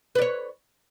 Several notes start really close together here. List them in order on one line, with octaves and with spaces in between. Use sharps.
B4 D5 C#5